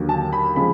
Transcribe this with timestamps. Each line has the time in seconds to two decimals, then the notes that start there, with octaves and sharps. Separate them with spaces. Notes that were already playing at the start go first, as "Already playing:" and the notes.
Already playing: D#2 D3 F#3
0.09 A5
0.33 B5
0.55 C#3 F3 G#3 B5